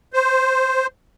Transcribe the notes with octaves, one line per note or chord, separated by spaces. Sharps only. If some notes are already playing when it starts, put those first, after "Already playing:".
C5